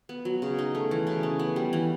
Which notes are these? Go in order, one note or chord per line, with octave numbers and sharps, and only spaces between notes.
B3
F#3
C#3
D#4
A3
E3
C#3
C#4
B3
G3
E3